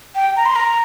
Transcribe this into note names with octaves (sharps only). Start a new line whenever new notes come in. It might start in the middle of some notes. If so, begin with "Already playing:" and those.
G5
A#5
C6
A#5